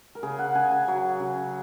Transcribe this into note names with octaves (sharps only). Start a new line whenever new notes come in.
A#4
C#3 G#4
F#5
C#3 G#5
G#5
F#3
C#3